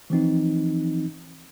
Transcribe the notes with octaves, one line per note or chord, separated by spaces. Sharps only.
E3 F3 C4 D#4